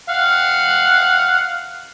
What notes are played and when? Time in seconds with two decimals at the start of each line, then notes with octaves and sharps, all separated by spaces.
0.09 F5 F#5